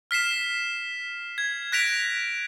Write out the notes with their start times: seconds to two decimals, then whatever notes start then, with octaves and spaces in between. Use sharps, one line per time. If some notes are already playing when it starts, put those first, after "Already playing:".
0.11 F6 B6 C7 E7
1.38 G#6
1.72 F#6 A#6 B6 D7 F7